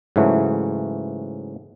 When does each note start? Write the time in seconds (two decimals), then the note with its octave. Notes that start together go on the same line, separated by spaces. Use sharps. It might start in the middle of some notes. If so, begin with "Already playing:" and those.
0.16 G#2 C#3 E3 F#3 A3